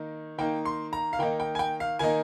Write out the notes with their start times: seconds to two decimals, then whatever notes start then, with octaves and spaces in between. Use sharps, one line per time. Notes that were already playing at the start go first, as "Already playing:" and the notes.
Already playing: D#3 A#3 D#4
0.38 D#3 A#3 D#4 G5
0.65 C6
0.93 A#5
1.13 F5
1.19 D#3 A#3 D#4 G5
1.40 G5
1.55 G#5
1.59 G5
1.80 F5
1.99 D#3 A#3 D#4 G#5